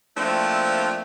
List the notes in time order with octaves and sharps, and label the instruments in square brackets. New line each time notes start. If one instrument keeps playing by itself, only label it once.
[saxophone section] F3 A3 A#3 C4 D4 E4